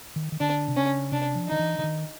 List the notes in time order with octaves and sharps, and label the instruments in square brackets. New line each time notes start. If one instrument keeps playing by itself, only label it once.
[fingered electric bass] D#3
D#3
[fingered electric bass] D3 [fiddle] D4
[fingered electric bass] C3
[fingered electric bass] C#3 [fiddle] C#4
[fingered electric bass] C3 [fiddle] D4
[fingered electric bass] F3
[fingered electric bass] D#3 [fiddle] D#4
[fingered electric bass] E3
D3
D#3